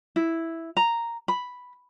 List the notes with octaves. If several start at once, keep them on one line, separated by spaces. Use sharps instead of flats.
E4
A#5
B5